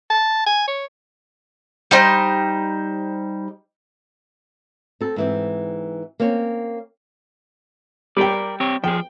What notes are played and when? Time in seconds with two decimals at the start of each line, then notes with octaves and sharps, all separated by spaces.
0.10 A5
0.46 G#5
0.68 C#5
1.91 G3 D#4 C5
5.01 C4 A4
5.16 G#2 E3 C4
6.20 A#3 C4 C#4 C#5
8.17 G3 A#4 D5 G5
8.60 C4 G4 C#5
8.84 F3 G#4 G5